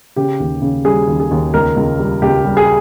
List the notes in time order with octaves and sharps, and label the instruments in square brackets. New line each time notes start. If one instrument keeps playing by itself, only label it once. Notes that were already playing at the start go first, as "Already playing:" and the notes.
[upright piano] C#3 G4
D#2
C#3
G3 G#4
D#2
G#4
D#2
C#2 A#4
C#2
G3
C#2 G4
G3
G#4